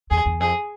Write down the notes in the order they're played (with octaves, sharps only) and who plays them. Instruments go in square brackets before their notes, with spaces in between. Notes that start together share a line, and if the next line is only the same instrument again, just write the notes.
[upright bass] E2 [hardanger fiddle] G#4
[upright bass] E2
[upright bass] F2 [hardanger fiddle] G#4